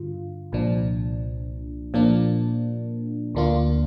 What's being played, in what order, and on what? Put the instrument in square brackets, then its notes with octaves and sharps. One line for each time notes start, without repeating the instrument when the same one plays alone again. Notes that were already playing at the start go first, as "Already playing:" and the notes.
Already playing: [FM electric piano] G2 D3 F4
C2 A#2 F3 D4
A#2 F3 A#3 D4
D2 D3 A#3 D4 F4